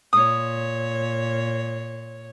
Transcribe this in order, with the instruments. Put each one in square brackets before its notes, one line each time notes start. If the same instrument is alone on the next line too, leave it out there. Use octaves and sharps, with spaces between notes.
[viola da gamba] A#2 C#5 [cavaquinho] D#6